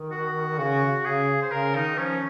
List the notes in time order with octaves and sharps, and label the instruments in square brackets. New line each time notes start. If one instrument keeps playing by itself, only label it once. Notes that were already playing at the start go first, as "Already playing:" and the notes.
Already playing: [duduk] D#3
[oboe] F#4
[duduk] C#3 [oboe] F#4
[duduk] C#3 [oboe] G#4
[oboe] C5
[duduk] C#3 [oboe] A#4
[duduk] D#3 [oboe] D#4
[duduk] F3 [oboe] C#4